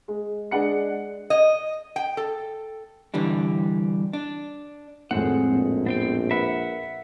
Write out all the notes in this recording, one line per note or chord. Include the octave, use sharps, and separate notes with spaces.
G#3
G#3 D4 F#5 C#7
D#5
G5
A4
G2 D3 E3 G3 D4
D4
G#1 F2 A2 G#3 C4 F#5
A#1
B3 C4 G5
A#4 B4 E5 F#5 B5